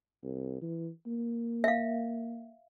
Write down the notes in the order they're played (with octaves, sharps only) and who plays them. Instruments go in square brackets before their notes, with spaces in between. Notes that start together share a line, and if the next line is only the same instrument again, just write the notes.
[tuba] C2
E3
A#3
[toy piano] E5 F5